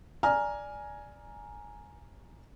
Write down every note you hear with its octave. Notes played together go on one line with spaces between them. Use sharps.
D5 G#5 A#5 F6